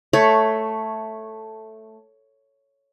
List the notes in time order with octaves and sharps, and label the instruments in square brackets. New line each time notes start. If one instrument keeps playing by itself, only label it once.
[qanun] A3 C#5